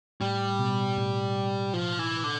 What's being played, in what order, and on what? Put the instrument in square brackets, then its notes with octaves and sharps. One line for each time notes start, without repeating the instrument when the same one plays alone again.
[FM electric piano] A2 [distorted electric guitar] G3
[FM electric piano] B2
A2
[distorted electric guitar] F3
E3
D3